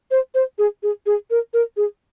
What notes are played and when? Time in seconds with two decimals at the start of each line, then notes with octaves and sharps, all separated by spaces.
0.11 C5
0.35 C5
0.58 G#4
0.83 G#4
1.06 G#4
1.30 A#4
1.53 A#4
1.77 G#4